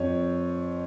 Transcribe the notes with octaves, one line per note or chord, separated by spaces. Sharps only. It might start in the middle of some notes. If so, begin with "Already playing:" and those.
Already playing: F2 F3 C#5